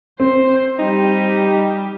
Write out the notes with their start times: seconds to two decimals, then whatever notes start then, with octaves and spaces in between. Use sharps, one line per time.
0.20 C4 C5
0.79 G3 D#4 G4